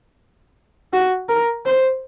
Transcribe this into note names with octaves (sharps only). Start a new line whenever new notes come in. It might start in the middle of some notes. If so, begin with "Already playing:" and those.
F#4
A#4
C5